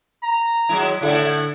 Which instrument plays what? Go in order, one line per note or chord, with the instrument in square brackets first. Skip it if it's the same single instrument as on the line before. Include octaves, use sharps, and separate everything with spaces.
[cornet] A#5
[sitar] F#3 G#3 E4
[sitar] A2 E4 [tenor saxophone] D3 [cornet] F#5